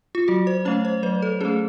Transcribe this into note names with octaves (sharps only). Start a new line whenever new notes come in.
F4
F#3 F#4
C5
A3 C#4 C#5
C5
F#3 B4
A4
A3 C#4 G#4